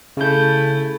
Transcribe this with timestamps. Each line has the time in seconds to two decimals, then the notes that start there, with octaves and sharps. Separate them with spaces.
0.17 C#3 A3 E4 G6